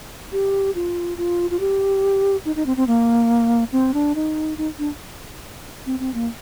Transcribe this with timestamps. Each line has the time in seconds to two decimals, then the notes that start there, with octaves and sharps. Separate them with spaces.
0.32 G4
0.75 F4
1.17 F4
1.50 F4
1.60 G4
2.45 D#4
2.56 D#4
2.66 C4
2.77 C4
2.87 A#3
3.72 C4
3.94 D4
4.15 D#4
4.58 D#4
4.79 D4
5.86 C4
5.99 C4
6.14 A#3